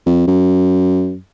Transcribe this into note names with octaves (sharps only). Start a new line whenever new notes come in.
F2
F#2